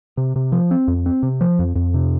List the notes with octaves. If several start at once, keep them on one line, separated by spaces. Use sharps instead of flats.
C3
C3
F3
C4
F2
C4
C3
F3
F2
F2
C3